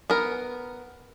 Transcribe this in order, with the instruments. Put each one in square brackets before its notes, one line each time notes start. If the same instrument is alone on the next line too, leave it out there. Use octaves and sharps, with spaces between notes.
[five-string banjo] B3 A#4